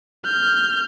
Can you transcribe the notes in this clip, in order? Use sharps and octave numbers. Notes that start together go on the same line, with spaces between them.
F6 G6